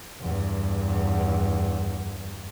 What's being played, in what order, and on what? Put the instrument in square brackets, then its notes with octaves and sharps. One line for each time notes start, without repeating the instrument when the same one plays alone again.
[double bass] E2 G2